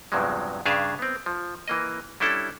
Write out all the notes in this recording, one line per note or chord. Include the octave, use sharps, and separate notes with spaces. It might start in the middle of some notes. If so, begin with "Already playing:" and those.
E2 G2 C3 F3 F#3 G#3
G2 C#3 D4 G#4 E5 F5
B3 C4
F3
E3 A#3 D#5
G3 C#4 D4 E4 A4